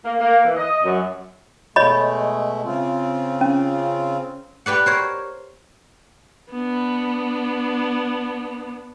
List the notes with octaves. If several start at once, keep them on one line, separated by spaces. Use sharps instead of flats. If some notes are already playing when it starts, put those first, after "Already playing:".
A#3
A#3
E3
D#5
F#2
B2 G#3 A3 C#5 D#5 B5
C#3 C4 F4
C#4
G4 B4 D5 F#5
A#4 C5 C#5
B3 D4